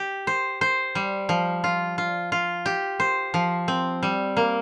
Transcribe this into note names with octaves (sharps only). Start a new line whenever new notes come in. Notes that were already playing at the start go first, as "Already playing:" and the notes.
Already playing: G4
C5
C5
G3
F3
F4
F4
F4
G4
C5
F3
C4
G3
A#3